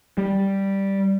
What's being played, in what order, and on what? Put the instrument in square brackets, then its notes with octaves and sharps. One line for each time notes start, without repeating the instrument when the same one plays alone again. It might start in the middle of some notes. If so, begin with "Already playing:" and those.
[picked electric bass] G3